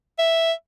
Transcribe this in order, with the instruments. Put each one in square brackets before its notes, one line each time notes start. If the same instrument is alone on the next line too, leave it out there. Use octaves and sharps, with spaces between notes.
[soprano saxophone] E5